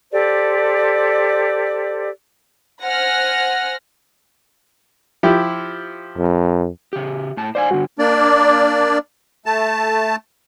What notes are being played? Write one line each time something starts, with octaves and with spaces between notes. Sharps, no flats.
G4 A4 C5 D5
C5 F#5 G#5 F6 A#6
F3 E4 G4
F2
C#3 G4
A2 A5
C5 D5 F5 G#5
G2 D3 F#4
A#3 D4 D5
A3 A5